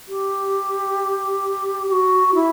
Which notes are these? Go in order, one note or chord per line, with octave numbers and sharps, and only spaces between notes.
G4
G4
F#4
E4